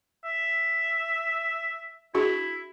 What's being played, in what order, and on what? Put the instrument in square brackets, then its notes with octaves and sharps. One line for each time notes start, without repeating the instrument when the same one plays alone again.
[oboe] E5
[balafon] D4 F#4 G#4 [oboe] E4